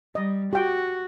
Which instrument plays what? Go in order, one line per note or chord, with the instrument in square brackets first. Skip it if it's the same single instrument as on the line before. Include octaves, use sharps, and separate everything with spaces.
[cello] G3 [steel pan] D#5
[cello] F#4 [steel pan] G4 G5